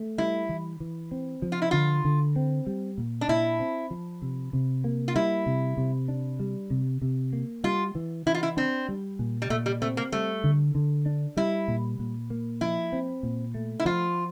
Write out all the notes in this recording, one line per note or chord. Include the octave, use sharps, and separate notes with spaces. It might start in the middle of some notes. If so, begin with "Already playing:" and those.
Already playing: A3
G3 E4
E3
E3
C4
F3
F4
E4
D3 F4
D3
C4
G3
A#2
D4
A#2 E4
C4
F3
C3
C3
A#3
F4
G3 E4
C3
C3
D4
G3
C3
C3
A#3
G3 F4
E3
E3 E4
F4
E4
C4 D4
G3
A#2
G3
A#2 A3
G3
A3 C4
A#3
G3 A3
D3
D3
D4
G3 E4
A#2
A#2
A#3
F3 E4
C4
A#2
A3
E4
F3 F4